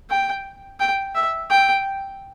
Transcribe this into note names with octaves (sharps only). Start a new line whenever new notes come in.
G5
G5
E5
G5